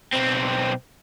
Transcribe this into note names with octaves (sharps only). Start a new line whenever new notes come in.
B1 C4